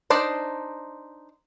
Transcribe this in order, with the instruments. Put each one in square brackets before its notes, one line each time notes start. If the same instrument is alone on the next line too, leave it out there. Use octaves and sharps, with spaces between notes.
[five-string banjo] D4 D#4 C5 D5